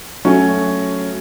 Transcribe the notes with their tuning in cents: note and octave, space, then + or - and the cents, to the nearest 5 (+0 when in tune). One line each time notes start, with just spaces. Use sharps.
F#3 +0 A3 +0 C#4 +0